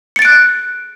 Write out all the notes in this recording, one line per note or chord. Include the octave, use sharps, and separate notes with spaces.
F#6 A6 C#7 D7